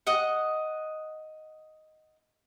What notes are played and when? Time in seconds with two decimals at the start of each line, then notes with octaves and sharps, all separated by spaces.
0.07 D#5 F#5